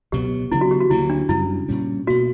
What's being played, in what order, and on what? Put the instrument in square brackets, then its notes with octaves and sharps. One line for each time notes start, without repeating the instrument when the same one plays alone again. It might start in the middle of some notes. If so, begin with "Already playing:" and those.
[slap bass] C#2 B2 F#3 B3 [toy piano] G4
[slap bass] C#3 F#3 B3 D4 [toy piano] E4
[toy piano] F#4
G4
F#4
[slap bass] D2 D3 F#3 A#3 [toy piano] E4
[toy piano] D4
[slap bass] F#2 C#3 G3 [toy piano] E4
[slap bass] A#2 G3 C#4
[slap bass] B2 A#3 [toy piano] F#4